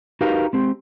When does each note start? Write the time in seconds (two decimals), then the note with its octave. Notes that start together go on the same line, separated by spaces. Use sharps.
0.21 D#4 F#4 G4 A#4 B4 F5
0.53 G#3 C4 G4